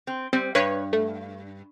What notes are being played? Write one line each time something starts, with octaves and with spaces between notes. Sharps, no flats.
C4
G3 C4
G2 B4 C#5
A3